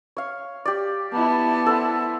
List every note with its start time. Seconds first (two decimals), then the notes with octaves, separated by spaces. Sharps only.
0.17 C#5 F5
0.65 G4 D5
1.13 B3 E4 A5
1.66 A4 C5 F#5